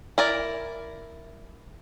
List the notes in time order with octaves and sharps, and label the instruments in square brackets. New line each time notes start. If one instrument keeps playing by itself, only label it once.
[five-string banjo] E4 A#4 D5